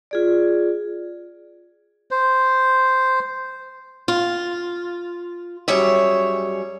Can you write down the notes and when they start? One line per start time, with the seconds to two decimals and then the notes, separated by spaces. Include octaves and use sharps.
0.11 F4 G#4 D5
2.11 C5
4.08 F4
5.68 F#2 G3 G#4 C#5 E5